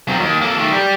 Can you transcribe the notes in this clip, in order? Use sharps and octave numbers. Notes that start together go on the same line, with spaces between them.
F#3 C4
D#2
A#3 A4
D#3 A3
G4 D5